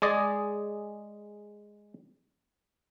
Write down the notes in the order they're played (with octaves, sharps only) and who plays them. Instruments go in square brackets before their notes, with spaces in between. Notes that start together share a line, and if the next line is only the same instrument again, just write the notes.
[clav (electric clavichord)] G#3 G#4 D5 D#5